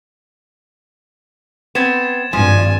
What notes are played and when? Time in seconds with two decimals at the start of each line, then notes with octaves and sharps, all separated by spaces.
1.75 B3 C4 G#6 A6 E7
2.33 G#1 G2 F3 G#5